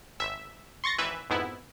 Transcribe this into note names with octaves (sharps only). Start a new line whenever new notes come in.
G#1 E5
C6 C#6 A6 A#6 C#7
G#1 E3 B4 E5
F2 G#2 B3 E4